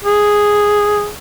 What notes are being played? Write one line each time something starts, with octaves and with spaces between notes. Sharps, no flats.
G#4